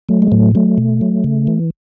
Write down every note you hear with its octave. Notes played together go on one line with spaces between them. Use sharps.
F#3 A3
G#3
A2 F#3 A3
F#3 A3
B2
F#3
C#3
E3